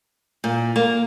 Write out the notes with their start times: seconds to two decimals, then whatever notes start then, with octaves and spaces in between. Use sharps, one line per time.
0.44 A#2
0.76 A#3